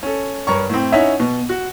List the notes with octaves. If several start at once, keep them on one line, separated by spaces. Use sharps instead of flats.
C#4 A4
G2 A#4 C#5 A#5 C#6
A2 C4
C#4 D#4 E4 C#5 E5 F#5
B2
F#4